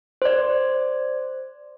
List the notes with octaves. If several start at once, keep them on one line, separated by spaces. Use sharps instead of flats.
C5 D5